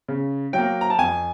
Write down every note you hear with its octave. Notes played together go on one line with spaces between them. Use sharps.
C#3
F#3 A#3 G5
A#5
A5
F2 G#5